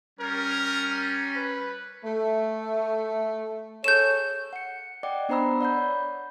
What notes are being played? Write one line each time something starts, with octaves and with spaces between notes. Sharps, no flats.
G3 C#4 A#4
B4
A3
G#4 A4 C#5 G6 E7
F#5 C#7
D5 D#5 F#5 G5 D6
B3 D4 C5 A#5 B5 E6
D5 F#5 B5 G6
C#5